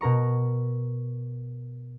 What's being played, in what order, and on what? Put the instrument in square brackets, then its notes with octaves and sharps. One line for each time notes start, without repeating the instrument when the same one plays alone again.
[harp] B2 A#4 A#5 C#6